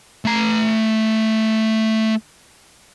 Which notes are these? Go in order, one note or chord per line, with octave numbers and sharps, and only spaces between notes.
A3 A#5